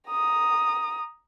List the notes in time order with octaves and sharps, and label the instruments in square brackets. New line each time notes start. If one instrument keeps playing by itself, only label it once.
[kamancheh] A#5 D#6